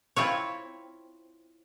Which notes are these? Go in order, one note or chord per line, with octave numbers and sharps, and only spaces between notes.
C4 E4 F4 C#5